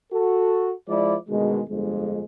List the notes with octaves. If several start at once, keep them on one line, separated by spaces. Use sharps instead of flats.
F#4 A4
F3 G#3 E4 D5
D2 B2 D#3 G#3
G1 F2 G#3